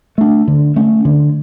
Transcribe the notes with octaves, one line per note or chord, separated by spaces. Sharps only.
A3 D4
D3
A3 C#4
D3